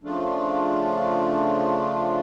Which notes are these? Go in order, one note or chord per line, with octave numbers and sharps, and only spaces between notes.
C#3 F3 A3 D4 F4